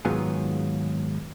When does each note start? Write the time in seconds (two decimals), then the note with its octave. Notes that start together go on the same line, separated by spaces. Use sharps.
0.05 G#2 D#3 F#3 B3 F4 G#4